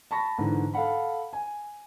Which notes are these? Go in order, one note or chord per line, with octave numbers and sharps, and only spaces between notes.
A5 B5 C#6 A#6
G#2 D3 E3
A4 F5 F#5 B5
G#5